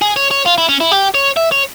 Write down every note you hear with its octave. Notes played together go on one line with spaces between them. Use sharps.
G#4
C#5
C#5
F4
E4
C#4
E4
G4
C#5
E5
C#5